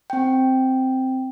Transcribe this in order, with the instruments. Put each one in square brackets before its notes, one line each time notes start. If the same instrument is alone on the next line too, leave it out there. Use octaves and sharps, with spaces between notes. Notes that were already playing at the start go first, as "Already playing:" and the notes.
[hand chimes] C4 G5